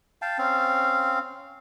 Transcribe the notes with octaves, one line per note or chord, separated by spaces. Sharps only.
F5 G5 A5
C4 C#4 F5